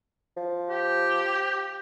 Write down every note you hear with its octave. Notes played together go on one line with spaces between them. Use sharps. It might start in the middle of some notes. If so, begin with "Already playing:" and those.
F3
G4